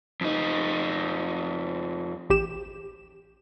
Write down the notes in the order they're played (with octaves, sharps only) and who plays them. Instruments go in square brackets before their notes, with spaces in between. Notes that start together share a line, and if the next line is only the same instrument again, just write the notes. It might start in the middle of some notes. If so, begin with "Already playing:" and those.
[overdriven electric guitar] F2 D#4
[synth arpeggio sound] A1 G4 E7